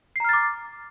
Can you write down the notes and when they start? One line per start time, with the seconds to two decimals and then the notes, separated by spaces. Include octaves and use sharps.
0.16 C7
0.20 A#5
0.24 F6
0.29 A6
0.33 D6